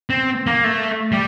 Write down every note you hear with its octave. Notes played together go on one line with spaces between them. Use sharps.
C4
A#3
A3
G3